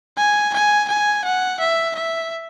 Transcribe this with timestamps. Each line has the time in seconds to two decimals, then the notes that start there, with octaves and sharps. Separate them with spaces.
0.17 G#5
0.54 G#5
0.88 G#5
1.24 F#5
1.60 E5
1.95 E5